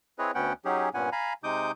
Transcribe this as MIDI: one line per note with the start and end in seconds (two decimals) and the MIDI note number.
0.19 0.31 60
0.19 0.31 64
0.19 0.31 68
0.19 0.31 71
0.19 0.31 73
0.19 0.31 75
0.35 0.53 38
0.35 0.53 59
0.35 0.53 61
0.35 0.53 78
0.35 0.53 79
0.65 0.89 54
0.65 0.89 61
0.65 0.89 63
0.65 0.89 67
0.65 0.89 68
0.94 1.10 43
0.94 1.10 46
0.94 1.10 59
0.94 1.10 61
0.94 1.10 78
0.94 1.10 80
1.12 1.33 77
1.12 1.33 80
1.12 1.33 82
1.12 1.33 83
1.44 1.71 48
1.44 1.71 56
1.44 1.71 63
1.44 1.71 86
1.44 1.71 87
1.44 1.71 91